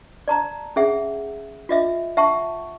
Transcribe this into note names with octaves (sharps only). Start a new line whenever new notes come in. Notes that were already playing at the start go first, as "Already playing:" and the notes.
D5 A5 A#5
C#4 G#4 E5 F#5
F4 D#5 E5
E5 F#5 A5 C#6